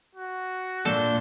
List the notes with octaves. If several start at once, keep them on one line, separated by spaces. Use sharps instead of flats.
F#4
A#2 D4 A4 A5 G6